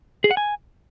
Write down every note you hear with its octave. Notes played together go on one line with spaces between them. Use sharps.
G#4
F#5
G#5